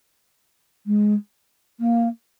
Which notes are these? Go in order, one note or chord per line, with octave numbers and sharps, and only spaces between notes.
G#3
A#3